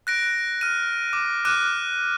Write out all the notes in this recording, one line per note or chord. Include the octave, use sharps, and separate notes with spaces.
F#6 A#6 D7
F6 D#7
D6
D6 F6 F#6 D#7